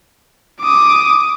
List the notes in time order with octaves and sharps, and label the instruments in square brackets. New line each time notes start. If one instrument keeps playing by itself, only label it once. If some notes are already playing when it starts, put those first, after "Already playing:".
[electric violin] D6 D#6